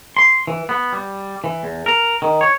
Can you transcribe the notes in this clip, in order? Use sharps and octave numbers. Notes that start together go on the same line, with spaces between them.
C6
E3
B3
G3
E3
E2
A#4
D#3
C#5